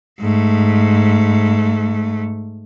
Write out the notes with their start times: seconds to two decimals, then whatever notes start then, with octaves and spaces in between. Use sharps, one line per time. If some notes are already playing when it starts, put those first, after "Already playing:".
0.21 G#2 A3